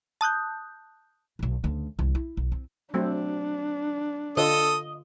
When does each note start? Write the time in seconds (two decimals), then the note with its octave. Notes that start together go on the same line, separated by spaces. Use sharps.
0.21 A5 D#6 F#6 G6
1.39 B1 B2
1.64 D2 C#3
1.99 C2 D#3
2.15 E4
2.37 B1
2.52 C4
2.94 F#3 A3 C4 D4
4.37 D3 F4 A4 D#5 D#6